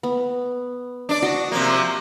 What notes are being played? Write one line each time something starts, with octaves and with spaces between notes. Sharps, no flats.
B3
D4 D5
F#4 D#5
C3 F3 A#3